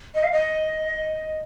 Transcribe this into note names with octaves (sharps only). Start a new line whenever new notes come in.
D#5
F5
D#5